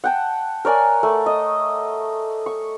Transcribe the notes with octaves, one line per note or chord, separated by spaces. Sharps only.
F#5 G5 A5
A#4 C#5 D5 G#5
A3
D#5
C#6